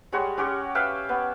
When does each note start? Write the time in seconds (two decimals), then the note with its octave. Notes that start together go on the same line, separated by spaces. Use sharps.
0.12 G3 G#3 F#4 C#5
0.37 C#4 F#4 G4 C#5
0.75 B4 E5 F5 G5
1.09 B3